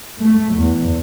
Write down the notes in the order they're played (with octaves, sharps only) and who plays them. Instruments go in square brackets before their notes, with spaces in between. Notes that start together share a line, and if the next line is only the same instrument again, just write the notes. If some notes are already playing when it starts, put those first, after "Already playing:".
[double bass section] A3
E2